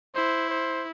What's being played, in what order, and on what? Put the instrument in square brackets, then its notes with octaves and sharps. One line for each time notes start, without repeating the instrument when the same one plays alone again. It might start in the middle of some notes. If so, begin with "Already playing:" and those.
[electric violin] E4 [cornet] C5
[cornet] C5